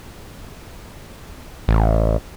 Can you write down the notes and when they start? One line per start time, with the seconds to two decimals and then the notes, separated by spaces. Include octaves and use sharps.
1.68 A1